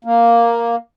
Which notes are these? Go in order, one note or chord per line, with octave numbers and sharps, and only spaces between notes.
A#3